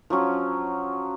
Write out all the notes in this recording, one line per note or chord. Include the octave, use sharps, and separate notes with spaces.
F3 F#3 C#4